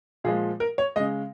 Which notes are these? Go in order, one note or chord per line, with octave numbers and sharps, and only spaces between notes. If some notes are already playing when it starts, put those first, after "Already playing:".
A#2 F3 G#3 G#4
A#4
C#5
C#3 G#3 D#5